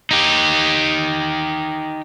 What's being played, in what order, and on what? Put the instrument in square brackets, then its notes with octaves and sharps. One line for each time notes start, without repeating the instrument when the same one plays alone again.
[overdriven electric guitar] D#4 G4